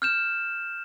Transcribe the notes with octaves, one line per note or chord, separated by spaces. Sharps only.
F6 G6 E7